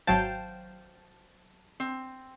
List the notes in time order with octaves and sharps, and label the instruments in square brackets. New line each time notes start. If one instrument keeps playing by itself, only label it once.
[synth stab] G#1 F#3 A5 [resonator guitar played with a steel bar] C5 F5 G5
[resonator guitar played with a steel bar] C4